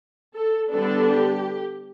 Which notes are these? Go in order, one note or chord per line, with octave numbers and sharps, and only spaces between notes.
A4
D3 G3 B3 D4 A4
G4